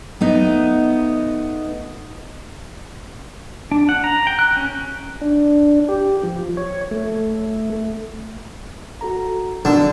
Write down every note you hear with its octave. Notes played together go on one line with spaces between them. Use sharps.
A3 B3 D#4
D4
F#5
A#5
G5
F#6
C#4
D4
G4
F3
C#5
A3
F#4 A4 A#5
B1 B2 D3 D4